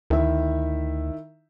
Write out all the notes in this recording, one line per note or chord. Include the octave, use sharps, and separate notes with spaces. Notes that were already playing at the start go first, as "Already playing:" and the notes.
D2 D#3 E4 E5